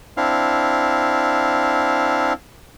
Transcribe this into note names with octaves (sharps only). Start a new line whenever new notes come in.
C4 D4 E4 F5